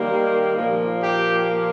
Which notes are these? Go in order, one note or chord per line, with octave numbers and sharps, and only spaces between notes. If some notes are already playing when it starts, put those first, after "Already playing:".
Already playing: D#3 G3 A#3 G4
A#2 F3 A#3
G4